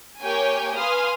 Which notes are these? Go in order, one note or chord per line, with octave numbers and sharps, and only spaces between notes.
A#3 G4 C#5 G5 G#5
B4 F5 G#5 C6 D#6 F6